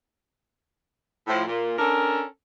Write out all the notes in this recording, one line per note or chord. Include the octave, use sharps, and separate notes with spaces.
A2 F3
A#2
C#4 D4 A4 A#4